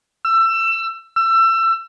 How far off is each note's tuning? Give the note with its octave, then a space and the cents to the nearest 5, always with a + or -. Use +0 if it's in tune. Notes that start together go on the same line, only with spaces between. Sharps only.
E6 +25
E6 +25